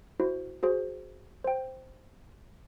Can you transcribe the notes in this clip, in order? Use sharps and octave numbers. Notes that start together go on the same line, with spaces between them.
E4 F#4 C5
F#4 G#4 C5
C5 G5